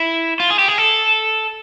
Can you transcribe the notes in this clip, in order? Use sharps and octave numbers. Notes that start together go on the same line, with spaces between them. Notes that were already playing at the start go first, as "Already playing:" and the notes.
Already playing: E4
F4
G#4
G4
G#4
A4